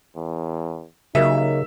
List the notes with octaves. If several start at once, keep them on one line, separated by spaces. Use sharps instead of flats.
E2
C#3 F#3 A#3 D#4 G4 E5